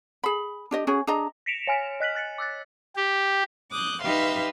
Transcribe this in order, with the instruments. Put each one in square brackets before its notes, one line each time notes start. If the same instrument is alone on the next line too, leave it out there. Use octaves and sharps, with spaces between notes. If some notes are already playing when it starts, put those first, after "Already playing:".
[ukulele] G#4 B5
D4 G4 D#5
C#4 F#4 G#4
D4 G#4 D#5 A#5
[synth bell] A#6 B6 C#7 D7 E7 F7
C#5 G#5 F6
D#5 F#6 B6 F#7
F#6 A6 B6 C#7
D6 E6 F#6 A6
[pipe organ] G4
[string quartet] D6 D#6 F#6 G6
D#4 G4 B4 E5 F5 C6